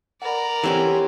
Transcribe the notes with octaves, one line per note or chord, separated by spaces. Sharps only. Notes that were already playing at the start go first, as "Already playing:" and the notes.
A#4 D5 F#5 B5
E3 C4 C#4 G4 A4